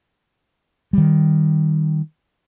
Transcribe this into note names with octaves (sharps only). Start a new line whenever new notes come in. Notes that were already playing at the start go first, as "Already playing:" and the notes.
D#3 G3